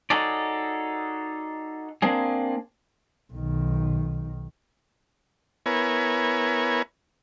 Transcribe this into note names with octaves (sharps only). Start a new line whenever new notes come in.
D#4 F#4 G#4 A4 C#5 D5
A#3 C4 D4 G#4
B1 D#3
B3 E4 A#4 C#5 G#5